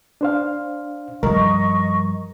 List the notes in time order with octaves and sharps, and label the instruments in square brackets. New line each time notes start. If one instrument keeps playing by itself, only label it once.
[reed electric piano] D4 C5 F5
[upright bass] G2 F3 [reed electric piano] A#4 [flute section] D#5 C#6